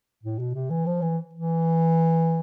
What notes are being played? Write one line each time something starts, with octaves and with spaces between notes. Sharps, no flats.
A2
B2
C3
E3
F3
E3
E3